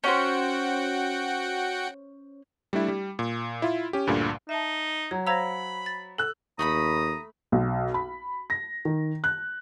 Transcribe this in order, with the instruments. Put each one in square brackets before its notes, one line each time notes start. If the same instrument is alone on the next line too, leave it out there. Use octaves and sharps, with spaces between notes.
[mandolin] C#4 C5 [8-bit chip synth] F#4 F#5 G5
[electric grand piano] G3 A3 D4 E4
G3
A#2
E4 F4
C#4 G4
D2 G2 A#2 D3
[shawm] D#4 [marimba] E5 A5
[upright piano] F#3 [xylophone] C#5 [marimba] A#5
[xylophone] C5 A#5 E6 [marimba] F5 G#6 A#6 [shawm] B5
[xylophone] A6
[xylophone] A4 [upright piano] E6 F#6
[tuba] D#2 [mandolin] A3 G5 B5 [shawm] A#5 [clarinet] D#6
[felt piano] B1
B5
A#6
D#3
F#6